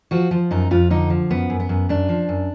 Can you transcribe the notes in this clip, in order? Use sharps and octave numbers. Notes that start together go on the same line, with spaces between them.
F3 F#4
F3
F#2 D#4
F2 F4
D3 D#4
F3
F#2 B3
F#2
B3
F#2
F#2 D4
F3
F#2